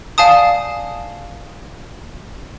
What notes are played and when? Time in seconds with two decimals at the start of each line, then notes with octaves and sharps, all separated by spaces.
0.18 D5 F5 G#5 A5 D#6